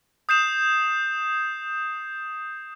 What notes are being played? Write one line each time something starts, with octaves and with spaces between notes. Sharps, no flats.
D#6 G6 C7 E7